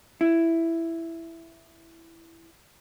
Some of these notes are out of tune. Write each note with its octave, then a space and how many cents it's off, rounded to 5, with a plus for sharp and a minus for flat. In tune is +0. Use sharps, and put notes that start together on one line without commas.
E4 +5